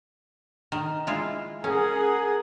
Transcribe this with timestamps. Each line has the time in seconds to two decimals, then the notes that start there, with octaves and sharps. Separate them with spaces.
0.72 D#3
1.07 G#3 E4 F4
1.64 C#4 G#4 A#4 F#5